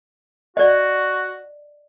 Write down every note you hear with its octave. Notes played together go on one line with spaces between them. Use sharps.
F#4 D5 D#5